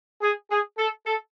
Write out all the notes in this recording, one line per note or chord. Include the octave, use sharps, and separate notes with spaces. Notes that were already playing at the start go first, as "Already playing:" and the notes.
G#4
G#4
A4
A4